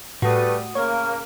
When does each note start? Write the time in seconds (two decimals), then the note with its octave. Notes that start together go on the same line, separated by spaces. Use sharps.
0.22 A2 G3 A3 F#4 B4 D#6
0.75 C#3 A#3 A#4 C#5